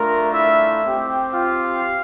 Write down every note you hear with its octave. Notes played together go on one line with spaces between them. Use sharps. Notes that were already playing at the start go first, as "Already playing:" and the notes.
Already playing: A3 D4 F4 A#4 A#5
E4 E5
C4 G4
F4 F5